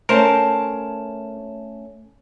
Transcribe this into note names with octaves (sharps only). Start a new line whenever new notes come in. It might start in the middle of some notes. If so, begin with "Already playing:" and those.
A3 C#4 A#4 C5 A5